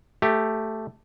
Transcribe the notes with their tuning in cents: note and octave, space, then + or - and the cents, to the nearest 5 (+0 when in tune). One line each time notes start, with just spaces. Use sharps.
A3 +0 G4 +0